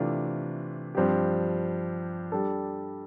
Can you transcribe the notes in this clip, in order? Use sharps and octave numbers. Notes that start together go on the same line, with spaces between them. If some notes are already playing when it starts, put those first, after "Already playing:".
Already playing: C3 E3 A3 D4 F4
G2 F3 C4 G4
G3 D4 A4